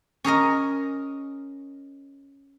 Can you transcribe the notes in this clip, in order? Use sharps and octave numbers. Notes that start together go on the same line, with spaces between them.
C#4 G#4 A#4 D#5